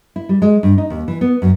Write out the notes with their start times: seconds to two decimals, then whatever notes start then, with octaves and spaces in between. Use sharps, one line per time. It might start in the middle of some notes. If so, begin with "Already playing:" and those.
0.16 E4
0.29 G3
0.42 G#3
0.63 G2
0.78 D#4
0.90 D#2
1.08 E3
1.21 B3
1.42 F#2